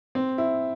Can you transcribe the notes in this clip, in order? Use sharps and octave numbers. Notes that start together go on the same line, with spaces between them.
C4
E4